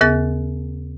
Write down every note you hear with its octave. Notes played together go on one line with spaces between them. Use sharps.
D#2 C#3 B3 G#4 A6